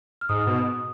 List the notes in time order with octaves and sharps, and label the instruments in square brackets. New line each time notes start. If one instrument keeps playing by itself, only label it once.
[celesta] F6
[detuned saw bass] G#2 [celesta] D#6
[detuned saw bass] B2